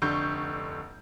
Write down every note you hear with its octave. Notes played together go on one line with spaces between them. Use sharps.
F1 D3 C#6 G6